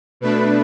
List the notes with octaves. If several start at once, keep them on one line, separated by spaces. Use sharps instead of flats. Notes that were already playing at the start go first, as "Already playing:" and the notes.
B2 A3 D4 B4